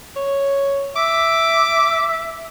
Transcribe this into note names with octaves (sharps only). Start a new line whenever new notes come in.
C#5
E5 D6